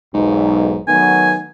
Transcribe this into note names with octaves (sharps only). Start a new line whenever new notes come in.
B1 E2 G#2
D#3 F#3 A3 B3 G#5